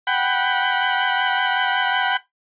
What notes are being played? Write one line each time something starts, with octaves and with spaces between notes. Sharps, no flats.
F#5 G5 B5